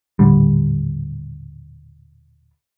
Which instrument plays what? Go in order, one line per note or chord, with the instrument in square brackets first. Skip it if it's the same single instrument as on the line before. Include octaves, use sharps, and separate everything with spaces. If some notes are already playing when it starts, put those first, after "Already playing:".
[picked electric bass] D#1 A2 D3 G3